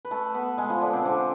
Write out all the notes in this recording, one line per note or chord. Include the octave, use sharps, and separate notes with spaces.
B4
A3 A4
B3 B4
G#3 G#4
F3 F4
D3 D4
C3 C4
D3 D4